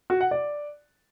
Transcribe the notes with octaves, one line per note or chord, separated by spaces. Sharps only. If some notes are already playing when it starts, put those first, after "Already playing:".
F#4
F#5
D5